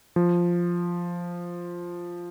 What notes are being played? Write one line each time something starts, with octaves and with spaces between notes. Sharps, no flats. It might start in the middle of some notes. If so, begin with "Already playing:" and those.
F3